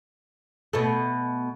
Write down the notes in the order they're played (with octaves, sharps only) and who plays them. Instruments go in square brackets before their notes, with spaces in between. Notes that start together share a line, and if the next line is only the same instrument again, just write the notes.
[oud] B2 A3